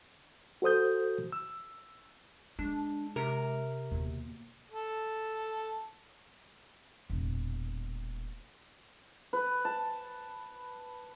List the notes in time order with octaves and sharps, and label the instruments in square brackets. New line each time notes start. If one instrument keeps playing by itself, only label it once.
[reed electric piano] F#4 A4 C5 D#6 G6
E6
[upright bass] G#3 [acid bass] D4
[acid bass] C3 [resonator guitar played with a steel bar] A#4
[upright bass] D#2 B2
[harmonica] A4
[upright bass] E1 A#2
[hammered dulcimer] B4
A5